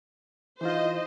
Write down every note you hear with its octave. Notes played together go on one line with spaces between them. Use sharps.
E3 D#4 F4 C5 D#5